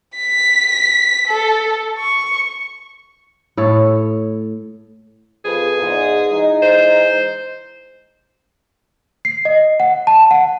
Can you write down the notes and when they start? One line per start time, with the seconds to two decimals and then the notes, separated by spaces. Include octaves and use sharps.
0.17 B6
1.27 A4
1.99 C#6
3.57 A2 A4 C#5
5.45 F2 G#4 B4
5.78 E2 G#2
6.31 E3 G#3 D#4
6.62 C5
9.25 C7
9.45 D#5
9.80 F#5
10.07 A5
10.31 F#5